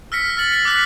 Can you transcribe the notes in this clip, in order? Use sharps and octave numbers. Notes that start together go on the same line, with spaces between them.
E6 F6 A#6 B6 C#7
F6 A6 F#7
C#7 F#7
D6 E6 F#6 B6 F#7